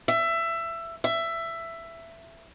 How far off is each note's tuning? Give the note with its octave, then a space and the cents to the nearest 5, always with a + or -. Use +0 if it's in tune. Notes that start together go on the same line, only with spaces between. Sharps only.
E5 +20
E5 +15